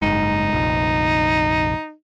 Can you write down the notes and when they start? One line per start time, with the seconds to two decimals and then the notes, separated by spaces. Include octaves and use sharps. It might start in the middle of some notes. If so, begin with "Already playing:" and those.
0.02 F#1 G#2 D#4
0.53 F1 A#1